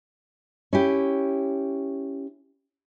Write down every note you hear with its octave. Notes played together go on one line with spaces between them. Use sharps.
C#4 E4 G4